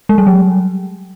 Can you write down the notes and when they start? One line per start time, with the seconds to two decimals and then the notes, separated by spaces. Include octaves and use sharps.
0.09 G#3
0.18 G3
0.27 F#3